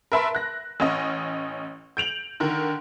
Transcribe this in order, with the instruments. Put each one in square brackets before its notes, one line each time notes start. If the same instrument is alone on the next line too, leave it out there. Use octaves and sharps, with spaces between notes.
[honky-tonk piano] A#4 B4 E5 A5 B5 C6
F#6 A#6
A1 C#4 D#5
G6 D7 F7 F#7
D3 D#3 A#4